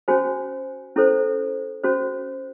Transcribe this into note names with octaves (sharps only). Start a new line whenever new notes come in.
C#4 F#4 C5 G#5
C#4 E4 A4 C5
C#4 F#4 C5